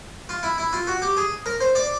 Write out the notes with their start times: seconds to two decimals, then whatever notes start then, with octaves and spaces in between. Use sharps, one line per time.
0.29 F4
0.43 E4
0.58 E4
0.73 F4
0.87 F#4
1.02 G4
1.17 G#4
1.46 A#4
1.61 C5
1.75 D5